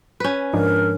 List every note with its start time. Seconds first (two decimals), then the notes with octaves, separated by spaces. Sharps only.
0.20 C#4 B4
0.53 G#2 F3 D4 A#4